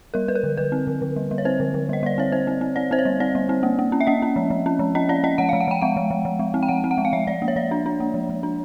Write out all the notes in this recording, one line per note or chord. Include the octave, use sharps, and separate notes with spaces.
G3 A#4
G3 B4
A#4
D3
D3 B4
C4
D3
D3
G3
G3
C#5
C4 C5
D3
D3
G3 D#5
G3 D5
C4 C#5
C4 C5
C4
C4
C4 D5
C4 C5
C#5
G3
C4 D5
G3
C4
A#3
A#3
C#4
E5
A#3 D#5
C#4
F3
F3
C#4
F3
C#4 D#5
C#4 D5
C#4 D#5
F3 F#5
F5
F3
F#5
F3 G5
G#3 F#5
F3
F3
F3
G#3
C4
G5
F3 F#5
C4
F#5
G#3
F5
F3 E5
F3 D5
A#3
C#5
F3 D5
D4
D4
A#3
F3
F3
D4